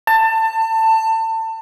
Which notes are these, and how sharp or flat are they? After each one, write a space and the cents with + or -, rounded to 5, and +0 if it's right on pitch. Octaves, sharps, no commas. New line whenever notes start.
A5 +25